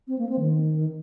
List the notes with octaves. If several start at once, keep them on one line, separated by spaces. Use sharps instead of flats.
C4
A#3
C4
D#3